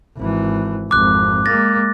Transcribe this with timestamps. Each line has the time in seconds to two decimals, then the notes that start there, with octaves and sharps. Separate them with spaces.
0.17 G#1 E3
0.91 G#1 F2 D6 F#6
1.46 G#3 A#3 A6 A#6